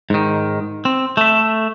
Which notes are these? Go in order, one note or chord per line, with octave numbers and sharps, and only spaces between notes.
G#2 D#3
C4
A3 E5